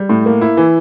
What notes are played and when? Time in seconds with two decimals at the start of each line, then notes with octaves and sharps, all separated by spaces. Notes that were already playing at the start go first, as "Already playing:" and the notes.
Already playing: G3
0.09 A2
0.26 A#3
0.41 E4
0.57 E3